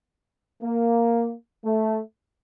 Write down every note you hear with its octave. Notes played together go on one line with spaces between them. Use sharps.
A#3
A3